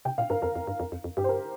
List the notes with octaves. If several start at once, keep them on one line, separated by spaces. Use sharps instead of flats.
C3 G5
A#2 F5
G2 A#4
F2 A#4
F2
G2
F2
F2
F2
G2 G4
C5
A#4